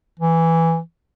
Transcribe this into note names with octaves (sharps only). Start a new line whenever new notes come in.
E3